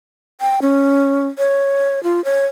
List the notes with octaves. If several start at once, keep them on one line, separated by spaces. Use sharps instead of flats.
G5
C#4
C#5
F4
C#5